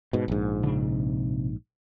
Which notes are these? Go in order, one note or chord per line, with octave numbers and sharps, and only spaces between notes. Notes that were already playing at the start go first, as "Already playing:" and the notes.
G#2 B2
A#1 G#2
C3 D4